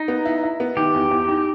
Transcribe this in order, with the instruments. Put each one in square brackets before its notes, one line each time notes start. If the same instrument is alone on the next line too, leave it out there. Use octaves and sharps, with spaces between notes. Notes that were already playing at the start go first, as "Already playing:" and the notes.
Already playing: [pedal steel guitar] D#4
[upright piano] B3
E4
E4
B3
[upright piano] D#3 [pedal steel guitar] G4
[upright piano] E2
E2
D#4